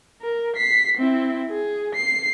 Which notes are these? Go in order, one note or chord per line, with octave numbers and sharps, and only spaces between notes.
A#4
B6 C7
C4 E4
G#4
C7